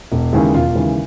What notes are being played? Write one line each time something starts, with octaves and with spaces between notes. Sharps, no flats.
E1
D#2 C#3 E3 G#3
E1 F4
D#2 C#3 E3 G#3